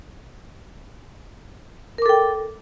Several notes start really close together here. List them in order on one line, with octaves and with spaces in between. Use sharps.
A#4 D6 A4 G5